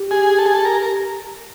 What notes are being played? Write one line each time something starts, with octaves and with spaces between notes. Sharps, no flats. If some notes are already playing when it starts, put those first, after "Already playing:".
Already playing: G4
G#4
A4
G#4
A4
A#4
A#4